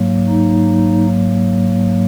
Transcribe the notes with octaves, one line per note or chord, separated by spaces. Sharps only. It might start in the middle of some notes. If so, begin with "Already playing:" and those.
Already playing: G#2 F#3 A#3
D#4